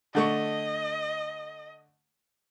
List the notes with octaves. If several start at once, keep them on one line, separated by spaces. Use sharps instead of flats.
D3 A3 D#5 C#6